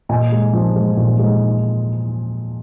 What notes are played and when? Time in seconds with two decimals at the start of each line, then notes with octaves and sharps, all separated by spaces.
0.09 A#2 D#5 G#5
0.32 G#3
0.53 F3
0.76 G#3
0.97 A#2
1.19 G#3